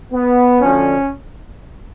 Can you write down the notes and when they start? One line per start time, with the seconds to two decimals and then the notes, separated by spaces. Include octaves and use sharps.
0.13 B3
0.61 D2 D3 F3 C#4